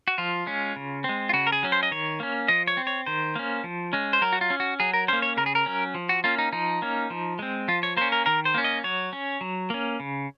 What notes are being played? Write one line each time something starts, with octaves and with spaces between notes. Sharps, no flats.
F#4
F3 F4
G#3 C#4
C#3
G#3 C4
F4
C#3 F#4
A#4
G#4
F#3 C#4
C5
D#5
D#3 C#5
A#3 C#4
F3 D#5
C#5
C4
C#5
D#3 C5
A#3 C#4
F3
G#3 C#4
C5
F#3 A#4
F#4
F4
C#4
F#4
F#3 G#4
A#4
A#3 C#4 C5
C#5
C#3 A#4
G#4
A#4
F#3 C#4
F3
F#4
A#3 C#4 F4
D#4
F3 D#4
A#3 C#4
F3
G#3 C4
F3 F4
C#5
A#3 C#4 C5
A#4
D#3 A#4
C5
A#3 C#4
D#5
F#3 C#5
C#4
F#3
A#3 C#4
C#3